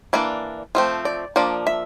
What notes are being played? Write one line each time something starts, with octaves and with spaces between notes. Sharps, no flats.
E3 A#3 D4 D5
F3 A3 C4
D5
F3 A#3 D4 D5
E5